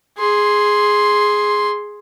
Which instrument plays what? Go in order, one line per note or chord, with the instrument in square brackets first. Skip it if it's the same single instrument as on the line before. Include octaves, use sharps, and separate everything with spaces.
[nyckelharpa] G#4 C6